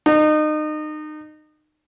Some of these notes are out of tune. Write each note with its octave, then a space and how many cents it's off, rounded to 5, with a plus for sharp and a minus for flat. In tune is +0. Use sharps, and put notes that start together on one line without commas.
D#4 -30